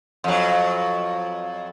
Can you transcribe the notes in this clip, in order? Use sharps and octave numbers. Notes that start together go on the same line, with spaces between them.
F2 F#3